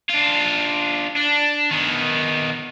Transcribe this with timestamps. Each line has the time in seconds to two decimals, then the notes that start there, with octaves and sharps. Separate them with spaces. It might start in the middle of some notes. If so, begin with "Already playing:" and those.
0.10 D4 F4
1.17 D4
1.71 D#3 B3